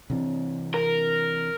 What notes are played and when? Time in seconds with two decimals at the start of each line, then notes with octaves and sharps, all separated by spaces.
0.10 C3 E3 C4
0.74 A#4